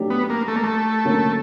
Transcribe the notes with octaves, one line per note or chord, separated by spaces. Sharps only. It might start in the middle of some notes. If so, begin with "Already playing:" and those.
Already playing: F#3 A3 D4 G4
B3
A#3
A3
A#3
A3
D3 F#3 A#3 C#4